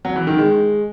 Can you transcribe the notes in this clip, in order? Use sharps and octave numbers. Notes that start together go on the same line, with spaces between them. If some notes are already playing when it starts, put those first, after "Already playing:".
F#3
E3
D#3
G#3